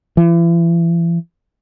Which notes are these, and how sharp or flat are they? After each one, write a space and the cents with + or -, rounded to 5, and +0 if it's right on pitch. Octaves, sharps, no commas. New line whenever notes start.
E3 +40